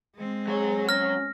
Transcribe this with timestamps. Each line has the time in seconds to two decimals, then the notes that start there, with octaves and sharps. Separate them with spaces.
0.15 G#3 C4
0.47 F#3 G#4 C#5
0.89 C#4 F6 A#6